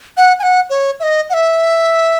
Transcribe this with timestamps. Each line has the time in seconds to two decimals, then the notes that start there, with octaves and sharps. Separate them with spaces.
0.17 F#5
0.39 G#5
0.43 F#5
0.70 C#5
1.00 E5
1.03 D#5
1.30 F#5
1.33 E5